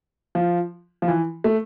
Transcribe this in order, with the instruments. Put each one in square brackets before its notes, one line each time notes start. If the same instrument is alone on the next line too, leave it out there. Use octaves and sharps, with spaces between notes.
[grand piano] F3
F3
E3
A3